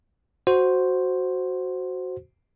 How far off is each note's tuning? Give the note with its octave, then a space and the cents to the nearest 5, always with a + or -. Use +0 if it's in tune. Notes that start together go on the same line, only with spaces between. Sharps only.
F#4 +0 C5 +0